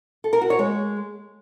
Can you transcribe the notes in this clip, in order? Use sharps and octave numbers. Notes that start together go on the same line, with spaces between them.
A4
A#4
F#4
C#5
G#3